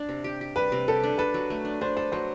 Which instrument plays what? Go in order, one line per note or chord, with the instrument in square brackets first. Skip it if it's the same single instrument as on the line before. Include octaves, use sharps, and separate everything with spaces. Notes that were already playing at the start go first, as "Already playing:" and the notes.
Already playing: [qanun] D4
C3
G4
G4
[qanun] G3 [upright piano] B4
[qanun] C3
[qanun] G4 [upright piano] A4
[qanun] D4
[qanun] A4 [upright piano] B4
[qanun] F#3
A3
D4
[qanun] D4 [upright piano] C5
[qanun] A4 [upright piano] C5
[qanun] F#3 [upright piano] C5